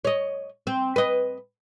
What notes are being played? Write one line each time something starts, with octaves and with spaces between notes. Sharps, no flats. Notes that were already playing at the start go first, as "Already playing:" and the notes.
C#5 D#5
C4
B4 D#5